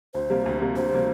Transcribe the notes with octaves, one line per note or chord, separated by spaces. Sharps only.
D2 C5
C3 G3 A#3
D2
C3 G3 A#3
D2 C5
C3 G3 A#3